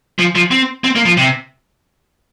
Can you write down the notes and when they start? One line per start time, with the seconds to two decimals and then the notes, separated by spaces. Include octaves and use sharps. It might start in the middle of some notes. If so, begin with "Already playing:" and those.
0.19 F3
0.35 F3
0.51 C4
0.84 C4
0.95 A#3
1.05 F3
1.17 C3